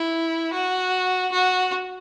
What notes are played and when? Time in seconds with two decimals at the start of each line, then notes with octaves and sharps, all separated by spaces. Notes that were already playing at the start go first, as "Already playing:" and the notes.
Already playing: E4
0.53 F#4
1.32 F#4